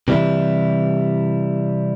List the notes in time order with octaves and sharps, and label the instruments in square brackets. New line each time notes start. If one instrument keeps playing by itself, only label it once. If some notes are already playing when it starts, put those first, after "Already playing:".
[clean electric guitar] C3 E3 G3 E4